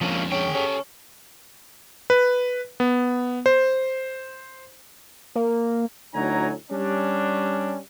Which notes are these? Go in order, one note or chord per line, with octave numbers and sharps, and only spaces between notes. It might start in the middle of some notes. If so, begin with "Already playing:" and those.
F2 F3 A#3 C#4 D4
C#4 G#4 G5
C#4 G4 A4
B4
B3
C5
A#3
D2 A2 F#3 D#4 G#5 A#5
G3 C#4 D4